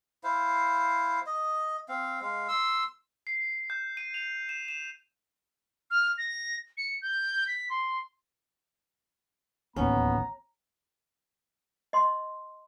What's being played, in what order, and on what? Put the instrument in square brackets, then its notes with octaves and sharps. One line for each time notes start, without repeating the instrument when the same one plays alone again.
[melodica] E4 C5 F5
D#5
C4 F5
G#3 F5
C6 E6
[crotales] C7
G6
D#7
F7
E7
E7
[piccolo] F6
A#6
C#7
G6
B6
C6
[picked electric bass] D1 A1 D#2 [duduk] B3 [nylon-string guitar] C#4 [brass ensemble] A#5
[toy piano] D#5 C6